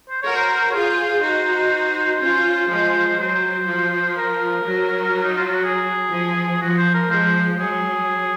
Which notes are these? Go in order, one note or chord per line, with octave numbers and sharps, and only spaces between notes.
C5
F#4 A#4 C#5
C5
C#5
F4 G#4 C5
D#4 F#4
C#4 F4 C5
F3 G#3
F#3 C5
F3
A#4
F#3
D#4
F4
F#4
G#4
F3
F3 F#4
C5
A#4
F3 G#3 C5
F#3 G#4